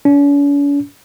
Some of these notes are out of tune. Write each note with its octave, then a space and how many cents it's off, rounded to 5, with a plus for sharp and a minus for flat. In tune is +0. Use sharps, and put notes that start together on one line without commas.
C#4 +45